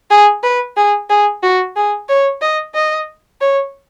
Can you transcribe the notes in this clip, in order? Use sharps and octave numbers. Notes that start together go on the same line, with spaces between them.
G#4
B4
G#4
G#4
F#4
G#4
C#5
D#5
D#5
C#5